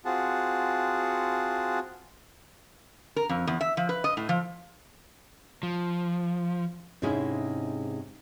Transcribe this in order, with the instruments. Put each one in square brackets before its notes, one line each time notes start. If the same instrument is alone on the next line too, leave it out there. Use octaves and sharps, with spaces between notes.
[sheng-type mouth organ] C4 F4 F#4 G#4 F#5 A5
[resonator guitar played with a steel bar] A#4
F2
E2
E5
F3
B4
D#5
A2
F3
[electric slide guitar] F3
[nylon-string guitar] G#2 C3 G#3 C#4 E4 G#4